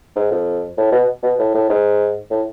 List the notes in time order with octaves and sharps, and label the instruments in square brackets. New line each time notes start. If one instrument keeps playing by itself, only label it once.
[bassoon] G#2
F2
A2
B2
B2
A2
A2
G#2
A2